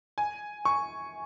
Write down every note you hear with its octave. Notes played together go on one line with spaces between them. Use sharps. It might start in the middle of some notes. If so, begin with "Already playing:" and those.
G#5
C#6